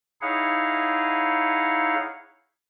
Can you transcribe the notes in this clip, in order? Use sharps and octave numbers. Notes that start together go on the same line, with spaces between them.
D#4 E4 G#4 C#5 F5 F#5